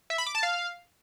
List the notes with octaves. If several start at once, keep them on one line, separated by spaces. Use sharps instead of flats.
E5
B5
D6
A5
F5